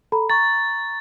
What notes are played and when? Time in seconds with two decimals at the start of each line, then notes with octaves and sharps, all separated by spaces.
0.12 A4 A#5 B5
0.30 A#5 C#6 A6